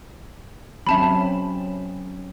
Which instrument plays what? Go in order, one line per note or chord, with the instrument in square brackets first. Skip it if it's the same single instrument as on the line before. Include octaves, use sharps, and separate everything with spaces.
[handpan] F#3 C4 C#4 [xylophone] E5 A5 B5